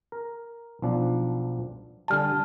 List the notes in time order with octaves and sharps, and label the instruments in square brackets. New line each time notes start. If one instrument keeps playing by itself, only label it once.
[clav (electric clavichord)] A#4
B1 F3 D4
[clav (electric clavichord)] D3 G3 G#5 [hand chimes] A5 F6